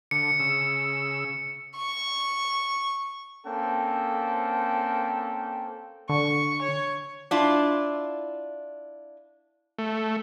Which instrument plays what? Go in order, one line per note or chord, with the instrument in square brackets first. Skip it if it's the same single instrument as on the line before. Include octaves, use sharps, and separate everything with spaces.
[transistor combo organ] D3 [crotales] C#7
[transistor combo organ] C#3 E6
[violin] C#6
[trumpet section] A#3 C4 C#4 A4 G5
[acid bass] D3 [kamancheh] C#6
[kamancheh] C#5
[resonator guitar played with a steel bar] D4 E4 F4
[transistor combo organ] A3